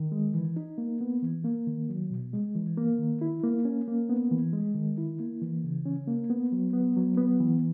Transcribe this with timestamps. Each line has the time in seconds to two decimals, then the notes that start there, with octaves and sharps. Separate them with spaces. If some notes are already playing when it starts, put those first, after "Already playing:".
Already playing: D#3
0.12 G#3
0.34 E3
0.56 D#4
0.78 A#3
1.01 B3
1.22 E3
1.45 A#3
1.67 D#3
1.89 F#3
2.10 B2
2.33 G#3
2.55 E3
2.77 A#3
2.98 D#3
3.21 E4
3.43 A#3
3.65 C#4
3.88 A#3
4.09 B3
4.31 E3
4.53 G#3
4.75 D#3
4.98 E4
5.20 A#3
5.41 E3
5.64 C#3
5.85 C#4
6.07 A#3
6.30 B3
6.52 F#3
6.73 B3
6.96 F#3
7.17 B3
7.40 E3